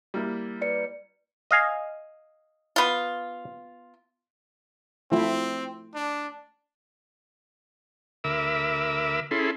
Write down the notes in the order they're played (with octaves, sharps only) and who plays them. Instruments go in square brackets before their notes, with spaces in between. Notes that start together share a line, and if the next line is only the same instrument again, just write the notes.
[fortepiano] G3 A#3 E4
[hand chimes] B4 D5 C#7
[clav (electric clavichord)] D#5 F5 G#5
[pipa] B3 F4
[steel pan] F3 A3 E4 [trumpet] C4
[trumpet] D4
[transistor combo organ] D2 A#4 E5 B5 D6 E6
C#4 E4 G#4 A4 B5 C6